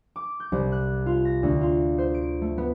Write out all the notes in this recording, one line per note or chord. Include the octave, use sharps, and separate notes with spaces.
D6
G6
C2
F#6
F4
A#6
D2
F4
C5
D7
A3
B3